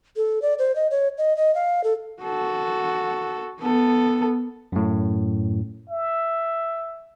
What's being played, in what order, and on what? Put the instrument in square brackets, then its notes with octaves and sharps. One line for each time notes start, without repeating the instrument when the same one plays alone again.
[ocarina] A4
D5
C5
D#5
C#5
D#5
D#5
F5
A4
[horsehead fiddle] F#4 A4
B3 A4
[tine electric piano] F#2 A2
[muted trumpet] E5